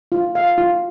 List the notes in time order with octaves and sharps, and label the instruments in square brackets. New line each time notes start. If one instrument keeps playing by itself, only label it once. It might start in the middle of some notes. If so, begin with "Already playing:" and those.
[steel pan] F4
F5
F4